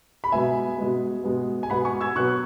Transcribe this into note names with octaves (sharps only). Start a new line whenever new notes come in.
B5
B2 G#3 B3 E5 G#5
B2 G#3 B3
B2 G#3 B3
G#5
B2 G#3 B3 F#5 B5
G#5 C#6
E6 G#6
B2 F#3 B3 C#6 F#6